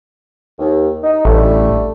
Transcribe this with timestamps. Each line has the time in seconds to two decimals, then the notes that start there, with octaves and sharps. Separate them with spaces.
0.59 D#2
1.03 D#4
1.25 A1 D3 G3 A3